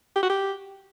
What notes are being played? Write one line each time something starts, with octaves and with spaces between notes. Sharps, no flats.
G4
F#4
G4